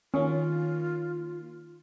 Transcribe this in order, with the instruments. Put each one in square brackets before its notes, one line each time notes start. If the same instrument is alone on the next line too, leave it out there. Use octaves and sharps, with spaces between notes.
[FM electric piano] D#3 A#3 [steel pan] C#4 [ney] F4